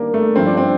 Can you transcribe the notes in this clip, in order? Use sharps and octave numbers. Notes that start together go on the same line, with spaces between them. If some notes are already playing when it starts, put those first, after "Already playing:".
Already playing: D#3 G3 A#3 D4
A3
G2 F3 C4
D4
C4